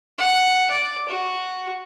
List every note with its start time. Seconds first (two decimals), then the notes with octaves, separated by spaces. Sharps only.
0.18 F#5
0.70 D5
1.08 F#4